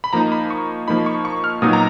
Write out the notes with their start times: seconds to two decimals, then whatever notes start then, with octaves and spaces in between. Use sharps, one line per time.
0.04 B5
0.13 F3 A#3 D#4 A#5
0.32 B5
0.50 C#6
0.88 F3 A#3 D#4 B5
1.06 C#6
1.25 C#6
1.44 F6
1.62 A#2 F#3 B3 D#4 D#6
1.73 A#5